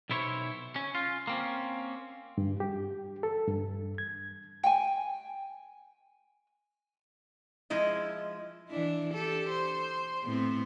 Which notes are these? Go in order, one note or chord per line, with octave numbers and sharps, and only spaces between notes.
B1 B2 E4 C5 C#5
C#4
F4
A#3 C4 C#4
G2
G4
A4
G2
G#6
G5 G#5
F3 G#3 E4 D#5
E3 D4 E4
G4 A4
C5
A2 B3 C4